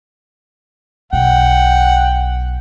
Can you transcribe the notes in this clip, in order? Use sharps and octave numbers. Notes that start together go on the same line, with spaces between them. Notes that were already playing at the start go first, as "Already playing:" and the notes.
B1 F#5 G5